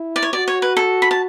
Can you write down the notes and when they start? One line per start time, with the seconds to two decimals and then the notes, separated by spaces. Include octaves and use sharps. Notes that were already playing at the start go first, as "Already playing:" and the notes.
Already playing: E4
0.16 D5
0.23 C#5
0.33 F#4 D5
0.48 C#5
0.62 B4
0.77 A4
1.02 B5
1.11 A5